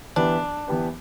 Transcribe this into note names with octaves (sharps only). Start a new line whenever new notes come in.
E3 B3 D4 G4 B4
E3 B3 G4 B4